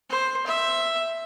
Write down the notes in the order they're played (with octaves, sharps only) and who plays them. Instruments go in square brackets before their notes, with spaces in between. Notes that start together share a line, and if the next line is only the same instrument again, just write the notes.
[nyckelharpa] C5
E5